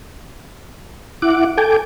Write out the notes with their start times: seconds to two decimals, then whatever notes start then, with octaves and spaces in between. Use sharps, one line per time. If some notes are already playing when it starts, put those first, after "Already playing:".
1.22 E4 F#5 D6
1.57 A4 G5 G#5 D6